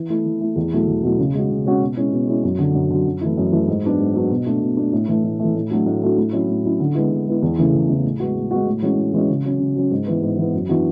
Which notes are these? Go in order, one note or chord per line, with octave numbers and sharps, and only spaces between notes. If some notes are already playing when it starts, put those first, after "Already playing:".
Already playing: E3
A3 E4
E3
A3 E4
E2
B2 F#3 A3 E4
E2
B2 F#3 A3 E4
C#3
G#3 C#4 F#4
C#3
G#3 C#4 F#4
B2
G#3 C#4 E4
B2
G#3 C#4 E4
F#2
D3 F#3
F#2
D3 F#3
F#2
E3 A3 E4
F#2
E3 A3 E4
G#2
F#3 B3 D4
G#2
F#3 B3 D4
B2
A3 D4
B2
A3 D4
A2
E3 A3
A2
E3 A3
A2
F#3 A3 D4 F#4
A2
F#3 A3 D4 F#4
A2
F#3 C#4 E4
A2
F#3 C#4 E4
D3
G#3 B3 E4
D3
G#3 B3 E4
E2
C#3 E3 A3
E2
C#3 E3 A3
A2
G#3 B3 F#4
A2
G#3 B3 F#4
A2
E3 G#3 C#4 F#4
A2
E3 G#3 C#4 F#4
C#3
F#3 C#4
C#3
F#3 C#4
G#2
E3 B3
G#2
E3 B3
F#2
E3 B3 D4 F#4